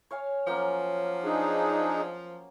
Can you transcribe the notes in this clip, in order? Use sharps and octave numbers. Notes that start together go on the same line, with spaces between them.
C#5 F5 G#5
F3 F#3 A#3 C#4
D4 D#4 G#4